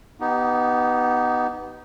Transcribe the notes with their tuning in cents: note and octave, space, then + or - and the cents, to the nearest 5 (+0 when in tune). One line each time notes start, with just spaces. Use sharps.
B3 +0 D#4 +0 G4 -30